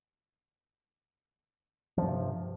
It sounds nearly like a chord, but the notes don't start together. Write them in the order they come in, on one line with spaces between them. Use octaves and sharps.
F3 G2 C3